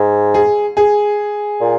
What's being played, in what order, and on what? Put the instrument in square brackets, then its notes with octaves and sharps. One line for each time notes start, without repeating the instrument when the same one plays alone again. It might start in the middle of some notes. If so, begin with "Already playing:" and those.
Already playing: [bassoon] G#2
[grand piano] G#4
G#4
[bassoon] A#2